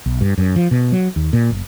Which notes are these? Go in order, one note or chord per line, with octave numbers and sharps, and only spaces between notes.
B1
G2
F#2
F3
B2
F#3
D#2
A#2
F#1